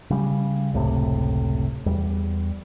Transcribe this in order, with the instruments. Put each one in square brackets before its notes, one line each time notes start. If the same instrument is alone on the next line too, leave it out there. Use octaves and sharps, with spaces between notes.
[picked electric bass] C#3 G3
F#1 C#2 A2 C3
E2 G3